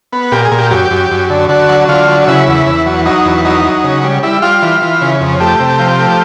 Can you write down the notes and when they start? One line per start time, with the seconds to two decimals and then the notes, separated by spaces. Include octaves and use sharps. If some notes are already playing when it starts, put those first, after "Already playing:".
0.13 B3
0.32 A#2 G4
0.45 G#4
0.52 A#2
0.58 G4
0.71 F#2 G4
0.91 F#2
1.11 F#2
1.30 D3
1.49 D3 F#4
1.69 F#3
1.89 D3 F4
2.08 F#3
2.28 C#3 E4
2.47 E2
2.66 E2
2.86 F#3
3.06 F#3 D#4
3.25 E2
3.45 F#3 D#4
3.64 F#3
3.84 C#3
4.04 G3
4.23 G3 E4
4.42 G3 F4
4.62 E3
4.82 E3
5.01 C#3
5.21 F2
5.40 A3 G4
5.60 C3
5.79 F3
5.99 A3